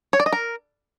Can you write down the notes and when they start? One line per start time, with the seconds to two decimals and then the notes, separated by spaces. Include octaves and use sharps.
0.13 C#5
0.20 D5
0.26 D#5
0.33 A#4